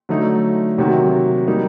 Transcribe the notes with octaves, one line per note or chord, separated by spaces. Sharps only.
D3 F#3 A3 D#4
C3 D#3 F#3 A#3 F#4
G3 A#3 D#4